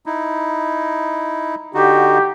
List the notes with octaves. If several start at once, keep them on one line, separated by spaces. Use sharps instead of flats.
D#4 E4
D3 D#4 F#4 G4